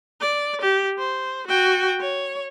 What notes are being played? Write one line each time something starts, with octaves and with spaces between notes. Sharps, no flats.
D5
G4
C5
F#4 G5
C#5